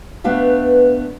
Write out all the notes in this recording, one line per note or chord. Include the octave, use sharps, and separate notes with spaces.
A3 B3 D4 B4 F5